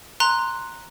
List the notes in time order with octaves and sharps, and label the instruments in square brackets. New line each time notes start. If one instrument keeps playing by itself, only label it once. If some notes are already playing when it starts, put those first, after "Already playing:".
[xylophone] A#5 C6 F#6